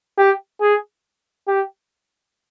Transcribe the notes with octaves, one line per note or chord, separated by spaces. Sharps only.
G4
G#4
G4